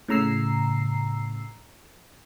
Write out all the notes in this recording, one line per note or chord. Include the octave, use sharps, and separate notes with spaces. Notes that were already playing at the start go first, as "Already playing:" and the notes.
A2 C#3 A#5 E6 C7